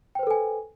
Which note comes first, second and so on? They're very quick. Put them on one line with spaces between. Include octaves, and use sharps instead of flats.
G5 C5 B4 A4 G#5